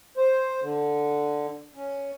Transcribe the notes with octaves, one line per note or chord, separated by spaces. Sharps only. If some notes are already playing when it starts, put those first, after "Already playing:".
C5
D3
C#4